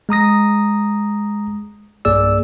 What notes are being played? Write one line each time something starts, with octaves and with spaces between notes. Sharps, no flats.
G#3 A#5 D#6 A#6
B1 G2 A#3 G#4 D5 E6